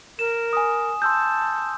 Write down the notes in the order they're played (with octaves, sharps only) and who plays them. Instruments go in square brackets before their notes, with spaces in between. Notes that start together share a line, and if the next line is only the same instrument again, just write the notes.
[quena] A#4 [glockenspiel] E7
[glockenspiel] G#5 D#6
[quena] A5 [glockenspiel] C6 E6 G6